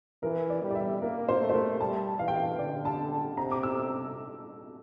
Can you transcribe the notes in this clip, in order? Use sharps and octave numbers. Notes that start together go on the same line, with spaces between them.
E3 A#4
D5
G3
D5
E5
A#3 A#4
C5
A3
C5
A#4
G3 A5
E3 F5
G5
F5
D3 D5
A5
C3 A#5
D6
E6